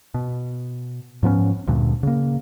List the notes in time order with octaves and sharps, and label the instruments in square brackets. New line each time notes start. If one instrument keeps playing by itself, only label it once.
[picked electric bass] B2
G#2 F3 B3 C#4
D2 G2 A#2
C#3 A#3